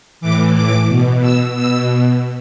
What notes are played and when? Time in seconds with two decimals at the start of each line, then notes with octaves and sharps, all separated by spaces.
0.21 A2 E3 D6
0.55 D6
0.88 B2
1.22 E6
1.55 B2 E6